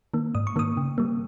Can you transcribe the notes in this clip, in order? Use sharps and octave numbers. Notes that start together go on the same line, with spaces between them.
D#3 A#3
G#2 D#6
C#6
D#3 A#3 D#6
C#3
G3 A#3